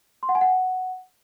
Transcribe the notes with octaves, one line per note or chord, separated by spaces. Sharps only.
C6
F#5
G#5
F#5